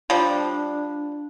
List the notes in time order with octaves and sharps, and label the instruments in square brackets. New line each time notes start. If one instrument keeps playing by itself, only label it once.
[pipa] F3 G3 [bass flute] D4